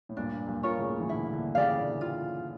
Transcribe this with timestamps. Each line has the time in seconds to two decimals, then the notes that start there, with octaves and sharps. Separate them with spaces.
0.09 A2
0.17 G2 A#2 D4
0.47 G2 A#2
0.63 F4 A#4 C#5
0.79 A2 C#3
1.00 E3
1.09 A#2 D3 E4
1.33 A#2 D3
1.55 C#3 E3 G4 D5 F5
1.79 A#2 D3
2.01 F4